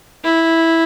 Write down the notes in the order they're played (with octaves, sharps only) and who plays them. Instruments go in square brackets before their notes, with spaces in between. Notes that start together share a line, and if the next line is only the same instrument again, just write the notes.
[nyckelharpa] E4